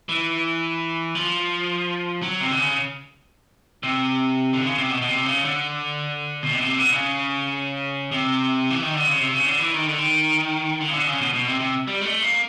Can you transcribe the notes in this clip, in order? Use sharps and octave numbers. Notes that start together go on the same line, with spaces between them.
E3
F3
F#3
C3
D3
C#3
C3
D3
C#3
C3
B2
B2
C3
C#3
D3
B2
C3
B2
C3
D3
C#3
C3
E3
D#3
D3
C#3
C3
C#3
D3
E3
D#3
D3
D#3
D3
C#3
D3
C#3
B2
B2
C3
C3
G3
G#3
A3
A#3